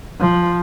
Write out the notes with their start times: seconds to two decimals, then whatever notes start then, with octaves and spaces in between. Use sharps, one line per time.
0.21 F3